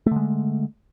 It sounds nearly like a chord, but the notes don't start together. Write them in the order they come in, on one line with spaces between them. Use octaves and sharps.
A3 D3 G#3